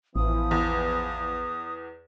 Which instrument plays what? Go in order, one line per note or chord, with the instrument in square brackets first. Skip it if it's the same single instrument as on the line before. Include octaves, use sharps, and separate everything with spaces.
[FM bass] A1 [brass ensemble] E3 F3 B3 [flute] D#6
[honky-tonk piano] E2